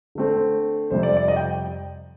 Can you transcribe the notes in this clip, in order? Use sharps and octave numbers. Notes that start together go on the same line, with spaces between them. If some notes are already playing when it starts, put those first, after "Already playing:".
D3 A3 C4
F2 C3 G3 C4 C5
D5
D5
D#5
G5